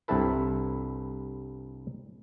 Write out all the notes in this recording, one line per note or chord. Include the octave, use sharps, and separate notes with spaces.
C2 G2 C4 E4 A4 B4